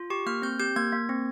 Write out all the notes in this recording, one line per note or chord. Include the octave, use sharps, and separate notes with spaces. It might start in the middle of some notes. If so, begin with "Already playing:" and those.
Already playing: F4
G4 C#6
A#3 F6
C4 G6
G4 G6
A#3 G#6
A#3
C4